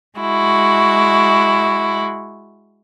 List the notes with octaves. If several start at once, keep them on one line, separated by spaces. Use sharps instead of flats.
G#3 E4 F#4